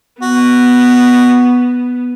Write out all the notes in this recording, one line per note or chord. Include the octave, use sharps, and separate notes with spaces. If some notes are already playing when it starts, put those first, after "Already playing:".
B3 F#4